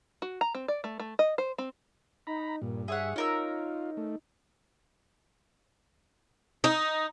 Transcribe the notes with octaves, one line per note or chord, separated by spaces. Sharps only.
F#4
A#5
C4
D5
A3
A3
D#5
C5
C4
D#4 A#5 B5
G2 A#2
G#4 C#5 E5 F#5
C#4 D#4 F4 A#4 E6
A3
D#4